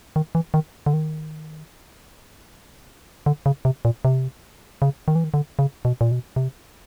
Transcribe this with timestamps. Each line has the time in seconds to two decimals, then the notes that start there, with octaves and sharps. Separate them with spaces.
0.16 D#3
0.35 E3
0.54 D#3
0.86 D3
0.93 D#3
3.26 D3
3.46 C#3
3.65 C3
3.85 A#2
4.05 C3
4.82 C#3
5.08 D#3
5.15 E3
5.24 D#3
5.34 D3
5.59 C#3
5.85 B2
6.01 A#2
6.12 B2
6.36 C3